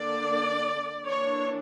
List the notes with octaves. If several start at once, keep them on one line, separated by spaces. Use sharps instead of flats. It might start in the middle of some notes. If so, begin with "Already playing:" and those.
Already playing: D3 A#3 D4 D5
E3 A#3 D4 C#5